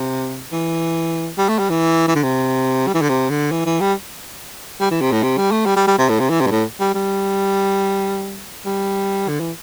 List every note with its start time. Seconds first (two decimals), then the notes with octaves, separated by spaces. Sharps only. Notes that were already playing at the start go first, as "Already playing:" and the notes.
Already playing: C3
0.52 E3
1.38 G3
1.49 A3
1.59 G3
1.69 E3
2.07 E3
2.15 D3
2.23 C3
2.87 G3
2.94 E3
3.01 D3
3.09 C3
3.30 D3
3.51 E3
3.66 E3
3.80 G3
4.80 G3
4.91 E3
5.01 C3
5.12 A2
5.23 C3
5.37 G3
5.51 A3
5.66 G3
5.76 G3
5.87 G3
5.98 C3
6.09 A2
6.20 C3
6.30 E3
6.41 C3
6.46 G2
6.51 A2
6.80 G3
6.94 G3
8.65 G3
9.28 D3
9.40 E3